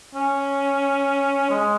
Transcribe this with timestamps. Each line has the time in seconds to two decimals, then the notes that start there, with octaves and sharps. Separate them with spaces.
0.15 C#4
1.50 G#3